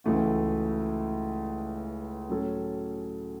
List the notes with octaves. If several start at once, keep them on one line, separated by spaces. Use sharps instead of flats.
C#2 C#3 E3 A3 F#4
A2 F#3 C#4 A4